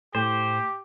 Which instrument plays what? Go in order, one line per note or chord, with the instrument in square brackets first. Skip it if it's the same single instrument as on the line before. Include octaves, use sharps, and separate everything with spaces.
[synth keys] A2 [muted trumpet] G4 [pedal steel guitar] C5